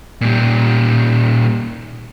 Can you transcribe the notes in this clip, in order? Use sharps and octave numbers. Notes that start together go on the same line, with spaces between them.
A#2 G3